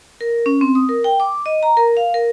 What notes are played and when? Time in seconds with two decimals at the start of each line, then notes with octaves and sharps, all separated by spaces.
0.21 A#4
0.46 C#4
0.61 C4
0.75 D#6
0.89 A#4
1.04 G5
1.20 D6
1.46 D#5
1.63 A#5
1.77 A#4
1.97 F5
2.14 A#4